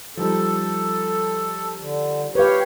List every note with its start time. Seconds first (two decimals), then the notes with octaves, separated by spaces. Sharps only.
0.17 F3 G3 D#4 A4
1.78 D3
2.35 G4 B4 C#5 F5